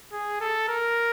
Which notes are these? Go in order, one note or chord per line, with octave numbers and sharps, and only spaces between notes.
G#4
A4
A#4